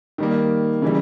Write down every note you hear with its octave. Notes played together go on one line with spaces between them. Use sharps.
D#3 G3 A#3
C#3 E3 G3